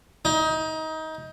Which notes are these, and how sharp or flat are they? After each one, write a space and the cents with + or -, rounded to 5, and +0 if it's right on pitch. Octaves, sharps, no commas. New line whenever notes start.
D#4 +25